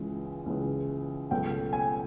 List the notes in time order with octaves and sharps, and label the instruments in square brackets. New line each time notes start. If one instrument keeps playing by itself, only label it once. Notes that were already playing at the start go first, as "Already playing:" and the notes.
Already playing: [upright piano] C#2 C#3 E3 G#3
C#2 C#3 E3 G#3
C#2 B2 F#3 A3 G5
G#5